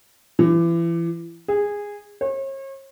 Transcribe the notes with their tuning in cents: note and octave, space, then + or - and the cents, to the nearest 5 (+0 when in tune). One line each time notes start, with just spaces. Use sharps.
E3 +30
G#4 -15
C#5 -40